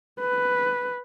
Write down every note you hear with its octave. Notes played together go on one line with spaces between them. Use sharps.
B4